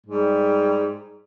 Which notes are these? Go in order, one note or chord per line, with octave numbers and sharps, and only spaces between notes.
G#2 G3